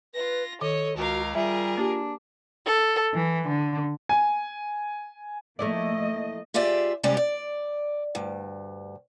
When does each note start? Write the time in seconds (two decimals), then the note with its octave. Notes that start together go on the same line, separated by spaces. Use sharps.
0.15 F4 B4 A#6
0.61 D#3 A4 C#5 D#5
0.97 C#2 F#4 A#4 F5
1.35 G3 F4 G#4 A#4 E5
1.77 A#3 D4 G4
2.66 A4
3.14 E3
3.49 D3
4.09 G#5
5.59 F3 A3 A#3 E4 D5 D#5
6.54 F4 G4 G#4 D5 E5
7.03 C3 G3 G#3 C#4 G4 D5
7.17 D5
8.15 D2 G2